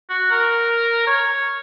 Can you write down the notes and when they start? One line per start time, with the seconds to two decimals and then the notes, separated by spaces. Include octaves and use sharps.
0.10 F#4
0.31 A#4
1.07 C#5